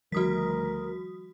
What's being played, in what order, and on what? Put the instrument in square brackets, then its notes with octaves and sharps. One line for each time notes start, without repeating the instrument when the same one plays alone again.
[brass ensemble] D2 [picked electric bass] D#3 F3 G3 [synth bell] F#4 D#6 B6 [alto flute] A#4